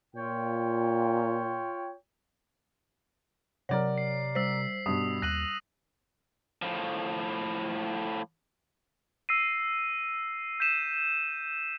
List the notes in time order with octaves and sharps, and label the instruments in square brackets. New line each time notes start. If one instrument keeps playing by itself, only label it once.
[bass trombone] A#2 [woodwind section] F4 C#5 G5
[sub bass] C3 [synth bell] F#3 C#5 [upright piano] A#4 D5 F#5
[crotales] C7
[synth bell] G3 C5 [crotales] E6 B6 C7
[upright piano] G2 B2 [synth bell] G3 [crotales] D#6
[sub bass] D#2 [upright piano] F#6 [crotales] A#6 D#7 F#7
[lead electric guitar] A2 F3
[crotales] E6 A#6 C7 D#7
G6 B6 D#7 E7